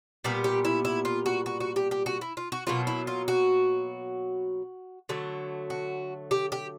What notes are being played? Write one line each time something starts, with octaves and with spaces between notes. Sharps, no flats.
A#2 G3 B3 G4
G4
E4
E4
F4
F#4
F#4
F#4
G4
G4
F#4
E4
F4
F#4
B2 F#3 A#3 F4
E4
F4
F#4
D3 F#3 A3
F#4
G4
G4